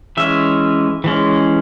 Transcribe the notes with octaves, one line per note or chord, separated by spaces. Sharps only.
E3 G#3 C#4 E5
E3 G#3 C#4